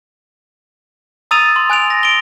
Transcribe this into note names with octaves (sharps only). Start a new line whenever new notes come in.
A#5 D#6 E6 A6 D#7 F7
C6
G#5 F#6 D7 F7
A#6
D7 G7